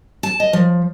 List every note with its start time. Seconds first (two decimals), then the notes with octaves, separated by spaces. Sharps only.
0.23 A5
0.40 D#5
0.53 F3